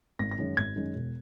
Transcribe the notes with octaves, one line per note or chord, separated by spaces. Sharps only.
G#1 A#6
A#6
F#2 D#3 G#3
G#1 G#6
F#2 D#3 G#3
E1